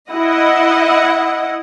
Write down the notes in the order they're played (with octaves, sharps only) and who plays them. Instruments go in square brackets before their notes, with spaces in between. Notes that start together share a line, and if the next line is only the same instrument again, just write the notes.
[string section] E4 D#5 F#5